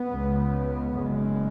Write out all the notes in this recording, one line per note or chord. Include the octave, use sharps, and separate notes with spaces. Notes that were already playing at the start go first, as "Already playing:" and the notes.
Already playing: B3
C#2 C#3
F#1 F#2 C#3 G#3